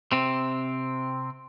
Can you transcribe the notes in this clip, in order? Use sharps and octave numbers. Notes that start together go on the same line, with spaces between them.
C3 C4